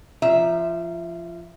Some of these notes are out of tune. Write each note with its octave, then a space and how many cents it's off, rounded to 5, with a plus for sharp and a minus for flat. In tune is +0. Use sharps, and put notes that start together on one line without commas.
F3 -25 E5 +0 A#5 +0